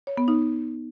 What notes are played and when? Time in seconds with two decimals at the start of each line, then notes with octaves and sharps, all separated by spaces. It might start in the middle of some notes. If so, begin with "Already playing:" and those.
0.07 C#5
0.17 B3
0.28 D#4